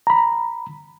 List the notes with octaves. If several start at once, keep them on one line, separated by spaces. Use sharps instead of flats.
A#5 B5